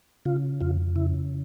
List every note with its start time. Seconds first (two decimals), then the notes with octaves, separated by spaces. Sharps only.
0.25 C#3 F4
0.61 F2 F4
0.96 C#3 E4